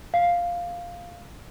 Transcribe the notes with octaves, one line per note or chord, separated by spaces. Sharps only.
F5